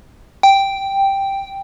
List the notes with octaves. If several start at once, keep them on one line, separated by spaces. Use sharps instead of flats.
G5